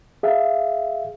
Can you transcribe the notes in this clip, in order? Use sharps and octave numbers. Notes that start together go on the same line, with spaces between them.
G#4 E5 F5